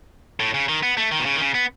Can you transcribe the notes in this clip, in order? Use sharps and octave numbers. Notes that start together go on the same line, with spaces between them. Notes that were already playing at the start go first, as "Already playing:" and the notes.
A2
C#3
D#3
B3
A3
D#3
B2
C#3
D#3
C#3
B3